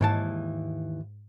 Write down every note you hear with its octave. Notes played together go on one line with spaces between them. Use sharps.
D#2 G#2 E3 A5